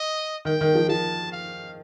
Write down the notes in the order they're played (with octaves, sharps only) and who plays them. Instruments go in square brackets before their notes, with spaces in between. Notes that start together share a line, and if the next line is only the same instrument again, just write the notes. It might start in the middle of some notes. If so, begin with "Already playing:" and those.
Already playing: [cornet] D#5
[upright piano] D#3 [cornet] G5
[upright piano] D#3
F3
[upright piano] F3 [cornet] A5
[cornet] F5